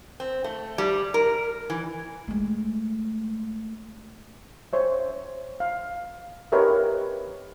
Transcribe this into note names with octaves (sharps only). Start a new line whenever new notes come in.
C4
A3
G3
A#4
E3
G#3 A3
C5 C#5 E5
F5
G4 A#4 B4 C#5 D#5 E5